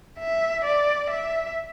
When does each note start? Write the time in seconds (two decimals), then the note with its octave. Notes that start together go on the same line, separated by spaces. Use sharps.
0.19 E5
0.64 D5
1.10 E5